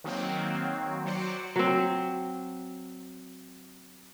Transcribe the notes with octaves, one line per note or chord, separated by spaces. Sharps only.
D#3 F#3 A#3 C4
F#3 C5 D5 C#7
F#3 C4